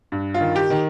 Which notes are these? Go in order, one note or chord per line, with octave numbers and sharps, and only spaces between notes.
G2
F4
D#3
G4
D#3